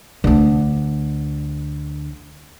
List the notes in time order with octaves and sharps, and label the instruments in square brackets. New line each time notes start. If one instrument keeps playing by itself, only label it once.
[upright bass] D2 D3